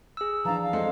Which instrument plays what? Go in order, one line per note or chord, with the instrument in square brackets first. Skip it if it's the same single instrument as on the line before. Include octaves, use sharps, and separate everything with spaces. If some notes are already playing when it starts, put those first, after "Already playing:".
[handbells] G#4 E6
[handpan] E3 F3 D4 [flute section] F5 A5 A#5
[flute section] F5
[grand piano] G#3 C4 A4